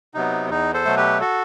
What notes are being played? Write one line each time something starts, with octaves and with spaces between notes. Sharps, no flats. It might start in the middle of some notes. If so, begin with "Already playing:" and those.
C3 F#3 B3 D#4
E2 D#4
A4 C5
B2 F#3 A3
G4 B4
F#4 A4